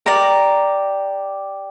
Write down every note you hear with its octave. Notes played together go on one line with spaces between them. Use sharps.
G4 A#4 D5 A#5